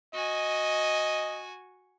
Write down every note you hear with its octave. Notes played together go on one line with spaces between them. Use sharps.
F#4 D#5 G#5